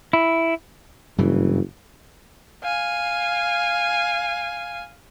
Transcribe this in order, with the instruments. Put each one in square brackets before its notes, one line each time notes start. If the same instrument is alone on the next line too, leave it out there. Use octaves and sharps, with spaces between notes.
[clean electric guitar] E4
[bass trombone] F#1 [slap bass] G2 C#3 E3
[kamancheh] F5 G#5